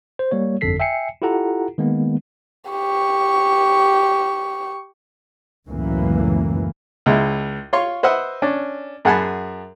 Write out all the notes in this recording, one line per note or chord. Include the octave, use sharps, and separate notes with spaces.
C5
G3 A#3 C#5
G1 F2 D3 A4 B6 C7
E5 G5 G#5 C7 C#7
E4 F4 G4 A4 F#5 A#5
D#3 G#3 A#3 B3
G4 C#6
C#2 F#2 A2 E3 A#3
C#2 G#3 E4
F4 C#5 C6 C#6
B4 C5 D#5 E5 F#5
C#4 D4
F#2 G#4 F#5 G#5 A5 B5